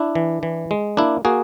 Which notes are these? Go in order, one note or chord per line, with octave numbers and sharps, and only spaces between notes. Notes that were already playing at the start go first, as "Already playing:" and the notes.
Already playing: D4 E4
E3
E3
G#3
A#3 D4 E4
A#3 F#4 G#4